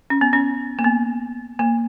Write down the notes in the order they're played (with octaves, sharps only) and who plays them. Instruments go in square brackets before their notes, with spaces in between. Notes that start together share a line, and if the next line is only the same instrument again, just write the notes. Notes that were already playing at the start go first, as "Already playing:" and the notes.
[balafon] C#4
B3
C#4
A#3
B3
A#3